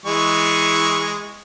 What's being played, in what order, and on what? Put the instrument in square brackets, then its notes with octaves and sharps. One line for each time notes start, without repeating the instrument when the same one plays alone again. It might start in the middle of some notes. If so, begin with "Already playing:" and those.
[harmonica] E3 G#3 C#6